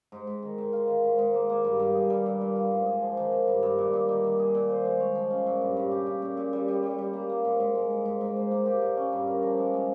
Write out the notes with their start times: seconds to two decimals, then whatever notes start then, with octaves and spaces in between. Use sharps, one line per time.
0.12 G#2
0.27 G#2
0.43 D#3
0.58 D#3
0.73 F4
0.88 D#3
1.04 G#2
1.18 G#2
1.34 A#3
1.50 A#3
1.64 G2
1.80 G2
1.95 G#4
2.10 G3
2.26 A#2
2.41 A#2
2.56 F4
2.71 G#2
2.86 G#4
3.02 F3
3.17 D#3
3.32 D#3
3.48 G2
3.63 G2
3.79 A#2
3.93 A#2
4.09 D#3
4.24 D#3
4.39 G#4
4.55 A#2
4.69 C5
4.85 G#3
5.00 C#5
5.15 F3
5.31 C#4
5.46 A#2
5.62 G2
5.77 G2
5.91 G4
6.07 C#3
6.22 A#2
6.37 A#2
6.53 G3
6.68 G3
6.83 G3
6.98 G3
7.13 A#3
7.29 A#3
7.45 G#2
7.60 G#2
7.75 G#3
7.90 G#3
8.05 G#2
8.21 G#2
8.36 C5
8.51 A#3
8.66 G4
8.82 A#2
8.97 C#4
9.12 G2
9.27 A#4
9.43 F3
9.58 G#3
9.74 G#3